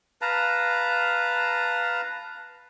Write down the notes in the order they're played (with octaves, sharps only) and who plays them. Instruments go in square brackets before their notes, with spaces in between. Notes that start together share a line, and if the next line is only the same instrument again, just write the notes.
[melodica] B4 F5 A5 A#5